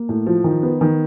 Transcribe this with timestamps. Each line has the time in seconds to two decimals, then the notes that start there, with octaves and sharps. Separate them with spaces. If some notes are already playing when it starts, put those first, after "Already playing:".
Already playing: A#3
0.09 A2
0.26 F3
0.44 D#3
0.63 B3
0.81 D#3